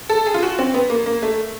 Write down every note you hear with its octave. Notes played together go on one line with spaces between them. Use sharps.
A4
G#4
F4
F#4
C4
B3
A#3
A#3
A3